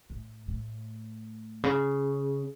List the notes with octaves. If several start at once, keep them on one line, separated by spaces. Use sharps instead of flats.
A2
A2
C#3